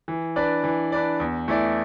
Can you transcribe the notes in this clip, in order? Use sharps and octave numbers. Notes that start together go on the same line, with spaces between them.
E3
D4 B4 D5
E3
D4 B4 D5
E2
E3 A3 E4 D5